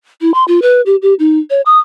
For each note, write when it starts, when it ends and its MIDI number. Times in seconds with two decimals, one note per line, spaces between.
0.21 0.31 64
0.34 0.44 84
0.48 0.62 65
0.62 0.81 71
0.86 0.96 67
1.02 1.14 67
1.19 1.39 63
1.50 1.61 73
1.66 1.79 87